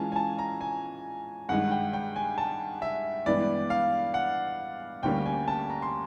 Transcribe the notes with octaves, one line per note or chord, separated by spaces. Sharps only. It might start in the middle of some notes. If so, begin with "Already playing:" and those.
Already playing: E3 G#3 C#4 F4 G#5 A5
G#5
A5
A#5
G#5
G2 D#3 G#3 F#5
G5
G5
G#5
A5
E5
G2 E3 G#3 B3 D5
F5
F#5
D2 D3 G3 A#3 C#4 G5
G#5
A5
A#5
C6